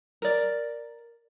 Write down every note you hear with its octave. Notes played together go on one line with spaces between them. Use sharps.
A#4 D5